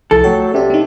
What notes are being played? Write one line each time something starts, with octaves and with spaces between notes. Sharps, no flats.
C2 F3 E4 A4
F#3 A3 G5
C3 C#4 D5
C4 D#4